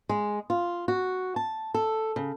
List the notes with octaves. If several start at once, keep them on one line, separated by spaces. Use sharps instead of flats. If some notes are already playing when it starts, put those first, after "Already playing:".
G#3
F4
F#4
A5
A4
C#3